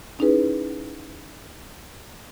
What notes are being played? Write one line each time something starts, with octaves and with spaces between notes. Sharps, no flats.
C#4 D#4 E4 G#4 B4